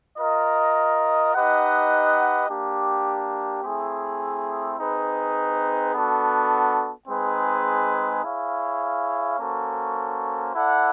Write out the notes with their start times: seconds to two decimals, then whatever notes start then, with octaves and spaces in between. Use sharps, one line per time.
0.18 F4 A#4 D#5
1.34 D#4 G4 B4 D#5 F#5
2.48 A#3 D4 G4
3.64 A3 C4 E4 G#4
4.78 C4 D#4 G#4 B4
5.94 B3 D4 F#4 A4
7.08 G#3 C4 D#4 G#4 B4
8.23 E4 G#4 C#5 F5
9.39 A#3 C#4 F#4 A4 C5
10.54 E4 A4 D5 F#5